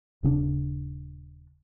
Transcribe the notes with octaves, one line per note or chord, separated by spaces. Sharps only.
D#1 C#3 C4 D4